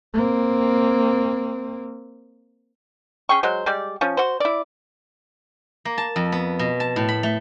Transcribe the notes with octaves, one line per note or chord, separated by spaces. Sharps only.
A#3 C4
C#4 G#4 G5 C#6
F#3 G#3 C5
G3 G#3 G4 D5
F3 C#4
F#4 C5
E4 D5
A#3
A5
F2
B3
B2
A5
A2
B5
A3